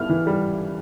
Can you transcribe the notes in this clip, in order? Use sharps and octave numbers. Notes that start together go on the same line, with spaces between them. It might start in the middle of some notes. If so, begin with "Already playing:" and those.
Already playing: G3 B3 E4 F6
E3
G3